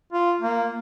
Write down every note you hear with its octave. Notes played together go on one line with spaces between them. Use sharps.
F4
A#3